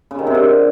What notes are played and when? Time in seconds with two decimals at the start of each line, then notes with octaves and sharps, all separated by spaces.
0.11 C#3
0.19 D#3
0.27 C3
0.35 D3